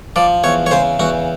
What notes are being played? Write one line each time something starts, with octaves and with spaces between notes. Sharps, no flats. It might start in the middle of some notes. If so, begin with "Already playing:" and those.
F3 D5
E2 C#5
C#5
C#3 C5
E2 F#4